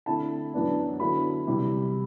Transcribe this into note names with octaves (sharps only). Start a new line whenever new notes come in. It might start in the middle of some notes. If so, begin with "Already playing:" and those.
D3 A3 C4 E4 A5
F#2 E3 B3 D4
D3 F#3 B3 E4 B5
C3 E3 G3